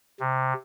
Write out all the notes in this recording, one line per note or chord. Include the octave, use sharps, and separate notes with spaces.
C3